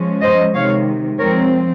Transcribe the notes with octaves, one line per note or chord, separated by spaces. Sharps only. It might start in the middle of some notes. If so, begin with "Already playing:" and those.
Already playing: F3 G#3 C#4
C5 D#5
C3 D#3 G#3 C#5 F5
F3 G#3 C4 A#4 C#5